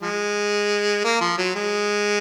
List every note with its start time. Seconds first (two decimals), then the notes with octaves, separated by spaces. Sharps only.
0.02 F3 G#3
1.04 A#3
1.21 F3
1.38 F#3
1.55 G#3